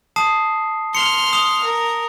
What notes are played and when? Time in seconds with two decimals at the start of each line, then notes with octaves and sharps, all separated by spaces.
0.16 A5 D#6 C7
0.95 C6 F6 C#7
1.33 D#6 F7 G7
1.64 A#4